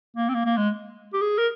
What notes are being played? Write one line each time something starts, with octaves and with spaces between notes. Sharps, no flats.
A#3
C4
A#3
A#3
G#3
G4
G#4
A#4